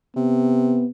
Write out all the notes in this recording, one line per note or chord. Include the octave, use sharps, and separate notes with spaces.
C3 B3